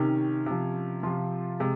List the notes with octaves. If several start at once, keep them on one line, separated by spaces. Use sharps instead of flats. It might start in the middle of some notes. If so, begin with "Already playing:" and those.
Already playing: C3 D#3 C#4
C3 F3
C3 F3 F4
C3 G#3